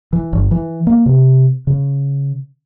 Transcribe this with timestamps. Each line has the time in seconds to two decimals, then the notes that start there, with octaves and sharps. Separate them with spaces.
0.13 E3
0.33 G1
0.51 E3
0.87 A#3
1.06 C3
1.67 C#3